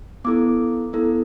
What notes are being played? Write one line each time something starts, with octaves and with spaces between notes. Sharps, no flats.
B3 E4 A4 D6
B3 E4 A4